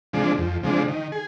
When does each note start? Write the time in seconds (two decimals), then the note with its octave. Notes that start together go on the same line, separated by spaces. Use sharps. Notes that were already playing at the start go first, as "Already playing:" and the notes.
0.13 C3 F3 G#3 D4
0.38 F2
0.63 C3 F3 G#3 D4
0.88 D#3
1.12 G#4